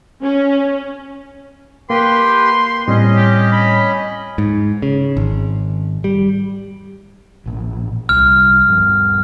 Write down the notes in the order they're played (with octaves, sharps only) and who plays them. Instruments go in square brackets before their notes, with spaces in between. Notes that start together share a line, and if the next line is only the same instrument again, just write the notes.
[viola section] C#4
[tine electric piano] A#3 [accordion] G4 B4 G5 [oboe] C6
[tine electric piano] A2 G3 C4 [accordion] C#4 D#5
[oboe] G4
B5
[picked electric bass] G#2
C#3
G#1
G3
[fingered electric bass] A1 A#2
[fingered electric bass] C2 F#3 G3 [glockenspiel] F6
[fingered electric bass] G2 F3 G3